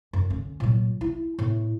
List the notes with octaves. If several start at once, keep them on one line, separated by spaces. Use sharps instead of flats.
F#2
D3 C#4
A#2 F#3
E4
A2 B3